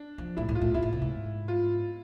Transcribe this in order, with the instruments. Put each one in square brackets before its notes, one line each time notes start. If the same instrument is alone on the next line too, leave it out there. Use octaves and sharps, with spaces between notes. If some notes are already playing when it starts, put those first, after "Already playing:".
Already playing: [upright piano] D4
[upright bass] F3
[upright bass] A2 [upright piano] E4
[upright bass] A2
[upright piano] F4
[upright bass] A2
[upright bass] G#2 [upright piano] E4
[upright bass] A2
C3
G#2
[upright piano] F4